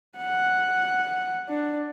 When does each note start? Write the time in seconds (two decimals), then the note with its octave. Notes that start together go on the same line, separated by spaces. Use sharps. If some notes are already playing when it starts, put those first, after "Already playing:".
0.17 F#5
1.49 D4